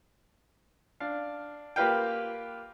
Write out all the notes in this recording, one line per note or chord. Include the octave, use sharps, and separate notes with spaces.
D4 F5
A#3 F4 G4 B4 F5 G5